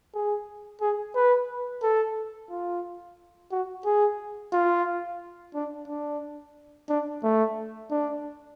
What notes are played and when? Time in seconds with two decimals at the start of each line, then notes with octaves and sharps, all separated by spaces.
0.14 G#4
0.81 G#4
1.15 B4
1.83 A4
2.50 F4
3.52 F#4
3.85 G#4
4.53 F4
5.54 D4
5.88 D4
6.89 D4
7.24 A3
7.91 D4